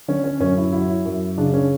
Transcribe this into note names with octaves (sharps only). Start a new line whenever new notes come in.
D3 C#4
C#4
F#2 C#4
E4
F#3 E4
F#2
C#3 D4
C#4